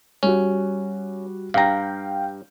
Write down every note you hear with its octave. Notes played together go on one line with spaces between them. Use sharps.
G3 C#4 F#4
G2 F5 G5 A#5